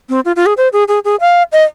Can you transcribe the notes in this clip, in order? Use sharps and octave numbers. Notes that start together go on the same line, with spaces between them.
C4
F4
F4
G#4
C5
G#4
G#4
G#4
F5
D#5